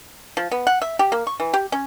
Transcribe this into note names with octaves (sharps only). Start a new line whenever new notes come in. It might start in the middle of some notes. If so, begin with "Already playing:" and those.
F3
B3
F#5
E5
G4
A#3
C#6
E3
G4
C#4